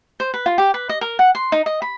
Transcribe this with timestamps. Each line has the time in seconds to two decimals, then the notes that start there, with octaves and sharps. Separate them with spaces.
0.20 C5
0.34 B4
0.46 F4
0.58 G4
0.74 B4
0.89 D#5
1.01 A#4
1.19 F#5
1.35 C6
1.52 D#4
1.66 D#5
1.82 B5